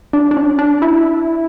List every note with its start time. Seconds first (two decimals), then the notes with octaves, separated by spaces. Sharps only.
0.13 D4
0.31 D4
0.37 C#4
0.59 D4
0.82 E4